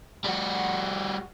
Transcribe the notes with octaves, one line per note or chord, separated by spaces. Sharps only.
G3 F#4